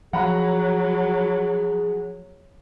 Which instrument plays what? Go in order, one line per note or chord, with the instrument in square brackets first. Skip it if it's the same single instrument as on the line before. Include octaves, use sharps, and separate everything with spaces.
[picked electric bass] F3 [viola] F#3 [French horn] G#4 [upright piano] F#5 A#5 B5